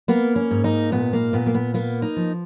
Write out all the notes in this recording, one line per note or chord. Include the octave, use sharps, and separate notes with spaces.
A#3 B3
C#4
G#2
D#4
A#2 B3
A#3
A#2 B3
A#3
B3
A#3 B3
D#4
F3